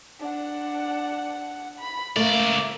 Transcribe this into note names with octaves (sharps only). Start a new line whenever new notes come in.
D4 F#5
B5
C#2 A3 A#3 D5 E5